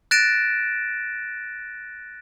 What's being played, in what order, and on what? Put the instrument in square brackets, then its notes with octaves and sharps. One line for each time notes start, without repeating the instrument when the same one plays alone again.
[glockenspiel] F#6 A6 A#6 D7 E7